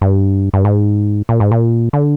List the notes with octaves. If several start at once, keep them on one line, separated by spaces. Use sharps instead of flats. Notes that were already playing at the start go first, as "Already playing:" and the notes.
G2
G2
G#2
A#2
G#2
A#2
D3